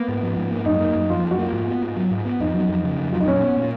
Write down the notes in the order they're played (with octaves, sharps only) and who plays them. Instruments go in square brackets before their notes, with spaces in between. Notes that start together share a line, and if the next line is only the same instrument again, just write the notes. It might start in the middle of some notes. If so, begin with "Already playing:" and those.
Already playing: [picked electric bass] A#3 [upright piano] B3
[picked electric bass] G#2
F3
G#2
A#3
[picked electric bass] F#2 [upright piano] D#4
[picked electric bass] A#3
F#2
[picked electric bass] F3 [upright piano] F4
[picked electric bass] F#2
[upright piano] F#4
[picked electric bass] A#3 [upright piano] F4
[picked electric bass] G#2
B3
G#2
F#3
G#2
B3
[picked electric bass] F2 [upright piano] D#4
[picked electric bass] F#3
F2
C#3
F2
[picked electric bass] F#3 [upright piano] F4
[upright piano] D#4
[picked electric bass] A#2 [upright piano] C#4
[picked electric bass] B3
A#2